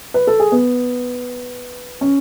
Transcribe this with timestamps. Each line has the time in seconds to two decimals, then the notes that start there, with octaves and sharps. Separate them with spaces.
0.14 B4
0.27 A4
0.40 G#4
0.52 B3
2.01 C#4